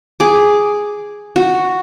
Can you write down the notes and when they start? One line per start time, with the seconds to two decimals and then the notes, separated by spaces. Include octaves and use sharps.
0.20 G#4 D6
1.36 F#4